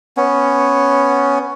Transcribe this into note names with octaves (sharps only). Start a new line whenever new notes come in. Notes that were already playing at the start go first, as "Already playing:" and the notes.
B3 C#4